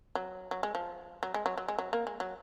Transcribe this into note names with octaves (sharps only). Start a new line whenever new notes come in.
F#3
F#3
G#3
F3
F#3
G#3
F#3
F#3
G#3
F#3
A#3
G#3
F#3